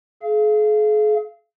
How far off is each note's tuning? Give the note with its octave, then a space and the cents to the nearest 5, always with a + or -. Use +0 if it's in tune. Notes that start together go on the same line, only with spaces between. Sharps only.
G#4 +40 F5 -25